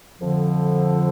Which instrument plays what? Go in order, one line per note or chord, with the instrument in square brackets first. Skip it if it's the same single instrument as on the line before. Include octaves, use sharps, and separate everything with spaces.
[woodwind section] F2 D3 F3